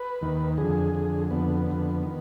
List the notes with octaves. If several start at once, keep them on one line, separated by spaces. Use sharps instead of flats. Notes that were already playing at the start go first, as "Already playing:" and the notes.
Already playing: B4
D#2 D#3
F2 D3 G#4
F2 D3
F2 D3 B3
F2 D3
D#3